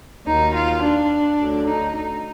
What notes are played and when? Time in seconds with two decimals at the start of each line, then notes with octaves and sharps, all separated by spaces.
0.26 D#2 D#3 F#3 D#4
0.54 F4
0.82 D4
1.40 D2 D3 F#3
1.67 D#4
1.95 D#4